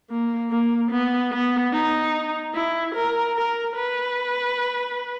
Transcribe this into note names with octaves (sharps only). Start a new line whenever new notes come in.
A#3
A#3
B3
B3
D#4
E4
A#4
A#4
B4